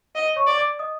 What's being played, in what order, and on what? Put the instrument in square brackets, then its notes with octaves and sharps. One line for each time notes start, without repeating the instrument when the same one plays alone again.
[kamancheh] D#5
[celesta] C#5 C#6
[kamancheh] D5
[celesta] D5 D6
D#5 D#6